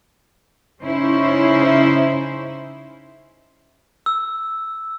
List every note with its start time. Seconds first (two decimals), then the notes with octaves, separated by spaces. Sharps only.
0.80 C#3 C#4 D#4 E4 C5
4.06 E6